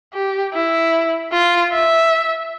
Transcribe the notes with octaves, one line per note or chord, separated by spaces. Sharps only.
G4
E4
F4
E5